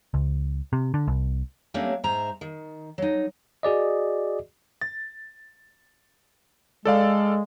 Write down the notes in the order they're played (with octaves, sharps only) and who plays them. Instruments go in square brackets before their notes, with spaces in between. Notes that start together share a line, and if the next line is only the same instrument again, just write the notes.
[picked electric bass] C#2
C3
D3
C2
[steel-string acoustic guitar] F#3 A3 A#3 C#4 D4 G4
G#2 C5 E5 A#5
D#3
F#3 D#4
[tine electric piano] F#4 G#4 D5 D#5
[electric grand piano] A6
[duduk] G#3 [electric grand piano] A4 D5 F5